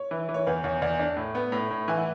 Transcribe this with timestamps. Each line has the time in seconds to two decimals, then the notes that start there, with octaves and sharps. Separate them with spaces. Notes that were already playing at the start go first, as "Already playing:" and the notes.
Already playing: C#5
0.11 E3
0.29 E3
0.34 C#5
0.47 E2 B4
0.64 E2 C#5
0.82 E2 D5
0.99 D4 D5
1.17 A2
1.35 B3
1.52 A2
1.71 A2
1.88 E3 G#5
1.97 F#5